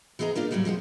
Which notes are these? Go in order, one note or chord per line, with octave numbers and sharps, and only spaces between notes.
E3 B3 G#4 D#5 A#5
A#3 D4 D#4 F4
A2 C3 D#3 F#3 G3 A3
C3 F3 G#3 F#4